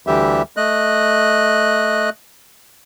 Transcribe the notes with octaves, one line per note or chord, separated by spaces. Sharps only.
D2 D3 E3 G3 G4 E5
A3 D#5 F#6